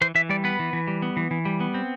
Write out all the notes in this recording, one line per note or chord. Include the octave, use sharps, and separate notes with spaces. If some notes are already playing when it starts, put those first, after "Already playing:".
E3 C5
E3 E5
G3 D5
B3 B4
E3
E3
G3
B3
E3
E3
G3
B3
C4